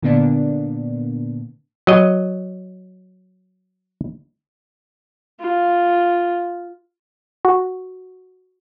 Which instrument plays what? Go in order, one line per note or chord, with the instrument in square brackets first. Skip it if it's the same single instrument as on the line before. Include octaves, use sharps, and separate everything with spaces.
[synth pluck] A#2 D3 A#3 B3 D4
[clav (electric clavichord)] F#3 D#5
[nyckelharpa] F4
[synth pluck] F#4